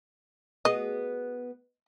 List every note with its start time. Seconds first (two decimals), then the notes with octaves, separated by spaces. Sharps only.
0.65 B3 F#4 G#4 D#5